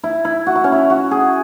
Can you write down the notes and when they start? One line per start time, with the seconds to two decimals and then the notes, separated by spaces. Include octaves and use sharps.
0.04 E4
0.25 E4
0.47 F#4
0.55 E4
0.64 C#4
0.72 E4
0.90 F#4
1.11 G#4